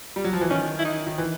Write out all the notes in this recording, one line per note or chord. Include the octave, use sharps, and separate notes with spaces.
G3
F#3
F3
E3
D#3 C#4
E4
D#4
D#3
E3